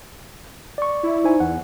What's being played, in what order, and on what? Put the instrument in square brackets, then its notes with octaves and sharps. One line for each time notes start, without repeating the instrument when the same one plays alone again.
[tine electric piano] D5 C#6
[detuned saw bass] E4
[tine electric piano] D#4 C5 G#5
[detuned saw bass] E2 [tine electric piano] F#5